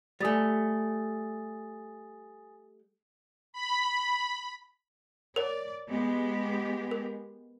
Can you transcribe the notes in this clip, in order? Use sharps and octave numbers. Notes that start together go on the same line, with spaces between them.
G3 A3 G#5 D#6 A6
B5
A#4 C#5 D5
G#3 B3 G4
A#4